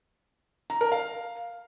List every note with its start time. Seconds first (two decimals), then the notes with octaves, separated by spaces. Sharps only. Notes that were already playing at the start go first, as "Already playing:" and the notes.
0.70 A#5
0.81 A#4
0.92 F5